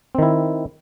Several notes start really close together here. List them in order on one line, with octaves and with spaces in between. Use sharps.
C4 D#3 E4